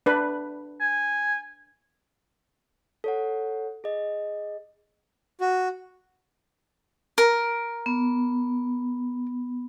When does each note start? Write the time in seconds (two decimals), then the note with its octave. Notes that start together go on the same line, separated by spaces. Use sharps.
0.06 D4 B4
0.80 G#5
3.04 A4 C#5 F#5
3.84 G#4 D#5
5.41 F#4
7.18 A#4
7.86 B3